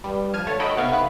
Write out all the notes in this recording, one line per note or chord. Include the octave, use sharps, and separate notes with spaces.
G2 G3
F3 A5 F6 G#6 D#7
D3 A3 C#5 A6
D#4 F#4 A4 D#5 G5 B5
B1 C3 B3 F5 C#6
A1 B4 F#6